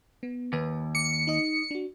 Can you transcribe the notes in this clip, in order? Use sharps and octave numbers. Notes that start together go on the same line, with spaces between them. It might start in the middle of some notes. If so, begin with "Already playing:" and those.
B3
D#2 B4
D6 C#7
D#4 D#5 D#6
D4 F#4